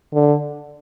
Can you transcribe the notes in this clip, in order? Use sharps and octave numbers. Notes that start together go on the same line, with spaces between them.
D3